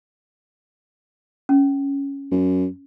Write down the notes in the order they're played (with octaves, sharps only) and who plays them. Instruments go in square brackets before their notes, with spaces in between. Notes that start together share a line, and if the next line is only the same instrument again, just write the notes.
[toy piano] C#4
[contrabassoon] F#2